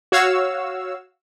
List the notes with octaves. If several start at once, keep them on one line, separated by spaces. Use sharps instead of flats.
F#4 C#5 F5 E6